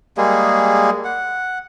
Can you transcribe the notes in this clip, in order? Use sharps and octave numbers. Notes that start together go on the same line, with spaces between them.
G3 G#3 A#3 G#4
F#5